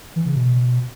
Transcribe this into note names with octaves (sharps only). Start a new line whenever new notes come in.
E3
C#3
B2